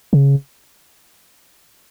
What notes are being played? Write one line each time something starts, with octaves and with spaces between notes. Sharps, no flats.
C#3